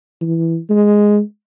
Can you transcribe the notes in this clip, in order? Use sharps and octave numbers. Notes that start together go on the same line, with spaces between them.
E3
G#3